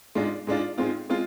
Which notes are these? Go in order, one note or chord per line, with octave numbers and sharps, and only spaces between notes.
G#2 G#3 D4 F4
G#2 G#3 D4 F4
G#2 G#3 C4 F4
G#3 C4 F4